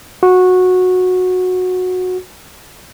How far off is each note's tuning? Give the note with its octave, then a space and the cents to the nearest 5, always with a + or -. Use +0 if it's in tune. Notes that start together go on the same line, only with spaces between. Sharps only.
F#4 -15